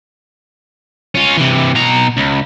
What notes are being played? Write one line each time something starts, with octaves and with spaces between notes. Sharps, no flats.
C#4 F4
C3 E3
B2 A#5
C#2